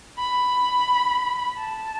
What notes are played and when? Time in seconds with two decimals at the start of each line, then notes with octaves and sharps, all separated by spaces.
0.18 B5
1.57 A5